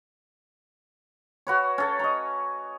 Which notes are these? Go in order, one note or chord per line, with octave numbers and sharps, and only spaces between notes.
F#4 B4 C#5
C#4 A4
D#5 A#5